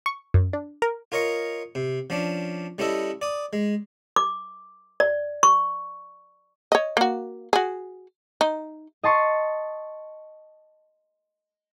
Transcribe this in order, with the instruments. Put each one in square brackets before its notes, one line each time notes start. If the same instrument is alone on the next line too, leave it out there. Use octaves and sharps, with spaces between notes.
[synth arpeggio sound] C#6
F#2
D4
A#4
[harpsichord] F4 A#4 C#5 D#5 C#6
C3
F3 C#4 D4
G3 C#4 E4 A4 D#5 E5
D5 D#6
G#3
[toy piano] D6
D5
C#6
[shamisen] C#5 D#5
A#3 F#4
F#4 G#4
D#4
[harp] D#5 A5 C6 C#6